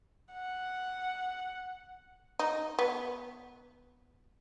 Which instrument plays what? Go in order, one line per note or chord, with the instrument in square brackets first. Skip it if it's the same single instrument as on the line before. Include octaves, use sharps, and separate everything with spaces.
[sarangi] F#5
[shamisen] D#4
B3